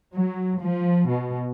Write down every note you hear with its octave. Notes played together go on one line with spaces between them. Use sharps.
F#3
F3
B2